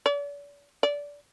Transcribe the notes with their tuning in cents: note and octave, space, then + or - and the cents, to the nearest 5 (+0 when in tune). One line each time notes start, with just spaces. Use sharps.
D5 -40
D5 -20